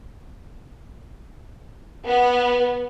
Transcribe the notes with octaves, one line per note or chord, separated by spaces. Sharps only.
B3